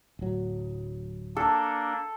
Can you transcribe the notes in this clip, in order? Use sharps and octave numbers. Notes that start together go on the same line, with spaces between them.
D1 F#3
A#3 D4 A4